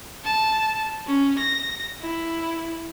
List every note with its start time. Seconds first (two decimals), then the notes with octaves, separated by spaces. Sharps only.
0.24 A5
1.07 C#4
1.39 A#6
2.01 E4